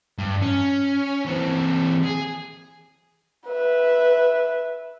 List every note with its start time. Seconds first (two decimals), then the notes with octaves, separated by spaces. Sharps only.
0.18 G2
0.42 C#4
1.25 E3 C4
2.05 G#4
3.47 B4 E5